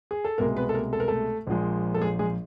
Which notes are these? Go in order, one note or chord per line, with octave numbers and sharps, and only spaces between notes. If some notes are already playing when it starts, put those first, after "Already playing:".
G#4
A4
C2 B2 G#3 A#3 A#4
B3 B4
A4
A#3 A#4
A4
A#4
A3 A4
A#1 A#2 F3 G#3
A4
G#3 G#4
G#3 G#4